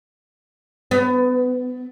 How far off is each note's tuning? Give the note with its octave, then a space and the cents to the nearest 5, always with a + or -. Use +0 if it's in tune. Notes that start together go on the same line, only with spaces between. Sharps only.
B3 +25